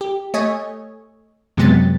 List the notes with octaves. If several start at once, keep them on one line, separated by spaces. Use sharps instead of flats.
G4
A3 C#5 D#5 G#5
F#2 C3 F#3 G#3 B3 A6